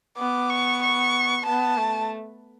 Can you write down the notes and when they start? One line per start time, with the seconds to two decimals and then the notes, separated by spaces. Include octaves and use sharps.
0.17 B3 D6
0.50 C#6
0.82 C#6
1.45 B3 A5
1.78 A3